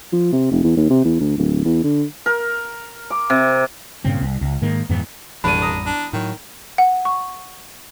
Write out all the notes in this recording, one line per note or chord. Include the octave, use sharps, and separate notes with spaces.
F3
C3
F1
E2
D#2
C3
E2
D2
D1
E2
D3
A#4
D6
C3
G2 A#2 C#3 C4
C2
C#2
G#2 D#3 A#3
F2 G#2 E3 B3
E1 A1 F2 G3 D4 B5 D#7
A#5 D#6
D4
A2 D#3 F#3
F#5
C#6